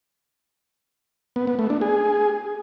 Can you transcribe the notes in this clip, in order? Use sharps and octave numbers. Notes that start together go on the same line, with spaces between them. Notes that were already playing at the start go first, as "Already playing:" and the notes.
B3
B3
A3
D4
G#4